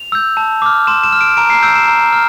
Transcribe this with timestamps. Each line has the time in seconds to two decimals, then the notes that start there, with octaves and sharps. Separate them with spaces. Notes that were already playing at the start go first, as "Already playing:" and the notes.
Already playing: F7
0.12 E6 G6
0.37 A5
0.62 D6 F6
0.87 C6 E7
1.03 E7
1.12 F6
1.21 D7
1.37 A#5 D7
1.50 C7
1.63 E6 G6 D7
1.76 E7
1.88 A#5
2.12 F6